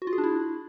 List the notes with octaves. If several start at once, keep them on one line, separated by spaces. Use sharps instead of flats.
F#4
F4
G#4
D4
E4